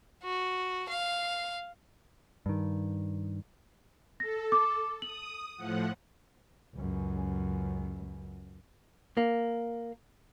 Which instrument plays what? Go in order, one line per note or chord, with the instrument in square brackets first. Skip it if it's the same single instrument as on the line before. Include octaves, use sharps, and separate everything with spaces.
[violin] F#4
F5
[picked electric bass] G2 D#3
[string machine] A4 [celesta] A#6
[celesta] D6
[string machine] D#6 [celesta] F#7
[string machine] A2 F3 F#5
[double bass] C#2 F#2
[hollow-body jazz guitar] A#3